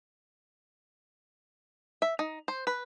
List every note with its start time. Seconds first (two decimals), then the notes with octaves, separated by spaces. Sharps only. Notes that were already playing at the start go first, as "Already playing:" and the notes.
2.02 E5
2.19 D#4
2.48 C5
2.67 B4